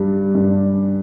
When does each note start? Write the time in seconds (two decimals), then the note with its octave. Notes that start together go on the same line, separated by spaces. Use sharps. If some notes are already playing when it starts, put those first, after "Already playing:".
Already playing: G2 G3
0.35 G2